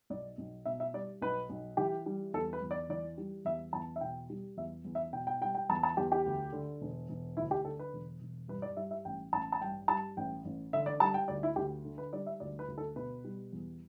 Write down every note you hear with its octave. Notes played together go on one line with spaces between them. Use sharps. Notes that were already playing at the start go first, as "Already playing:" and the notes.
B1 D5
B1
B2 E5
E5
G3 D5
B1 B4
B1
E3 G4
G3
E2 A4
B4
E2
D5
E3 D5
G3
E2 E5
E2 A5
E5
B2 G5
G3
E2 E5
E2
E5
B2 G5
G5
G3 G5
G5
E2 A5
A5
E2 G4
G4
D2
D3
E1
E1
D2 E4
G4
D3 A4
B4
E1
E1
G2 B4
D5
G3 E5
E5
A1 G5
A1 A5
A5
G2 G5
G3 A5
A1 G5
A1
D3 E5
D5
G3 A5
G5
D2 D5
E4
D2 G4
D3
B4
G3 D5
E5
D2 D5
B4
D2
A4
B2 B4
G3
E2